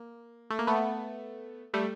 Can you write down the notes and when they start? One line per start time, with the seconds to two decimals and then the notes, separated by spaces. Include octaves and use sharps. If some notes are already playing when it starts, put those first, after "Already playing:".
Already playing: A#3
0.50 A3
0.59 A#3
0.67 A3 B3
1.74 G3 A3